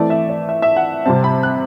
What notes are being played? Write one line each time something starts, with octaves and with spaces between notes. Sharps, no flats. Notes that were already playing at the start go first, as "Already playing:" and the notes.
Already playing: E3 A3 C4 D5
E5
D5
E5
E5
F#5
C3 G3 C4 A5
B5
F#6